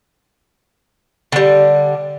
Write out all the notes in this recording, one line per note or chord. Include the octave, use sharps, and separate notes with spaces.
D3 G3